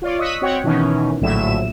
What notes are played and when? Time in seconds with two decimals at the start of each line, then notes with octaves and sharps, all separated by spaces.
0.02 F4 C#5 D5
0.19 D#5 C#6 D#6 E6 F#6 B6
0.41 C4 F#4 C#5 F#5 G5
0.63 B2 D#3 E3 C#4 D#4
1.21 A#1 A2 D3 F#3 E5 E7